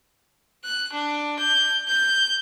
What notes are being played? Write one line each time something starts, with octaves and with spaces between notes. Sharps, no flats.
F#6
D4
G6
G6